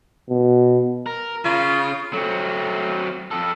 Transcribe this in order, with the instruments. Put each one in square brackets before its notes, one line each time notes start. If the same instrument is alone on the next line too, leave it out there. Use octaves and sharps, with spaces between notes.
[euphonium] B2
[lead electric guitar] A#4
[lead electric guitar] C#3 [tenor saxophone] F4
[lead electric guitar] F#3 C4 [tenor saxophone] A3
[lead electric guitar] F2 A4